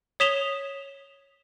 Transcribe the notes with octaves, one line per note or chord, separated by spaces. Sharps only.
C#5 D#6 B6 E7 F7 G7